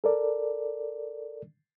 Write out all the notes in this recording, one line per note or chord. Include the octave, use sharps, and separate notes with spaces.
A4 A#4 D5